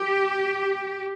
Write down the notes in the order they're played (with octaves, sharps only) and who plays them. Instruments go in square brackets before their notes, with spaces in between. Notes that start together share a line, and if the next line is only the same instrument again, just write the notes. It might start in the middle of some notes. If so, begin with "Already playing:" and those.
Already playing: [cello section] G4